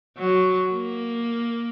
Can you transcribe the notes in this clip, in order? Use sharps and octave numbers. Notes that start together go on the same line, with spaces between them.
F#3
A#3